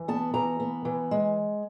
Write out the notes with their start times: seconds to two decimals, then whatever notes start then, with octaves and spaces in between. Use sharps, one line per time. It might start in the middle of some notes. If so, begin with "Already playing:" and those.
Already playing: E3
0.08 B3 A5
0.34 E3 A#5
0.60 B3
0.85 E3
1.11 G#3